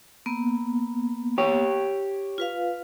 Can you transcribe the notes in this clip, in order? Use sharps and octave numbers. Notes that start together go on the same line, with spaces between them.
A#3 B3
G4 C#5
F4 B4 F5